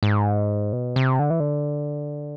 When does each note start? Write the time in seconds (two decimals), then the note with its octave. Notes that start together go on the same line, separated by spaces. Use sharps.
0.03 G#2
0.73 B2
0.96 C3
1.19 D3
1.30 E3
1.40 D3